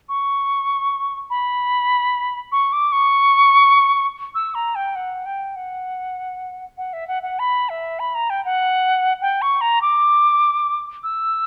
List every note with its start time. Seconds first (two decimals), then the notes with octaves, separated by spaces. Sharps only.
0.09 C#6
1.30 B5
2.52 C#6
2.73 D6
2.92 C#6
4.35 E6
4.55 A#5
4.75 G5
4.95 F#5
5.25 G5
5.56 F#5
6.78 F#5
6.93 E5
7.08 F#5
7.23 F#5
7.39 B5
7.69 E5
7.99 B5
8.15 A#5
8.30 G5
8.45 F#5
9.22 G5
9.42 C#6
9.61 A#5
9.82 D6
11.03 E6